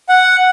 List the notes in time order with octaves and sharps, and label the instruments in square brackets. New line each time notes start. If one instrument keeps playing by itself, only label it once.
[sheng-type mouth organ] F#5